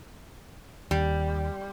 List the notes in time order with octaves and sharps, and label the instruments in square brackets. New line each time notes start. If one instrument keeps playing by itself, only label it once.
[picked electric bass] D#2 [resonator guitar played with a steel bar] G3